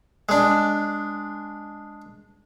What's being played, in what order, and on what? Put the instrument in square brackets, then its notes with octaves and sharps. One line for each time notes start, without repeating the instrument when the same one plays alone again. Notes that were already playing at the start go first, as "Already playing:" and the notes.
[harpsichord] G#3 D4